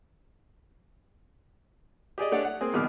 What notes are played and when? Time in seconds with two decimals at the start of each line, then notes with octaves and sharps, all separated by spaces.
2.18 G4 G#4 D5 D#5
2.32 A3 D4 G4 C#5 D5 F#5
2.45 F#5
2.61 A#3 C4 G#4
2.73 A#1 B2 D#3 G3 D6 F6